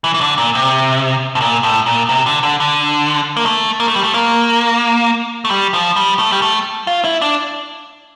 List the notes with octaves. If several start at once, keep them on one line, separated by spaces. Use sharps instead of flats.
E3
E3
D3
A#2
C3
A2
A#2
A2
A#2
C3
D3
D3
D3
A#3
A3
A#3
A3
G3
A3
A#3
A3
G3
F3
G3
A3
G3
A3
F4
E4
D4